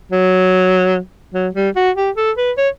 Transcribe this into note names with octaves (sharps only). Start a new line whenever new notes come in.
F#3
F#3
G3
F#4
G4
A4
B4
C#5